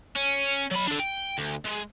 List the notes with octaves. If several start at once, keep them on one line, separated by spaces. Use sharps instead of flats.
C#4
F#3 B5
D4 A4
G5
D2
G#3